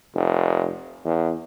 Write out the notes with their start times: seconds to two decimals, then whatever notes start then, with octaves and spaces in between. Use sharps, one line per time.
0.15 F1
1.05 E2